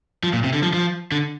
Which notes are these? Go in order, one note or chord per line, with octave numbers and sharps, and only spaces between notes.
F3
A#2
C3
D3
F3
F3
D3